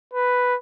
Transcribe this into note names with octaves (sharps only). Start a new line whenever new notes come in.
B4